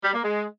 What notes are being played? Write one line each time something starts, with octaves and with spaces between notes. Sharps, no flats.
G3
A#3
G#3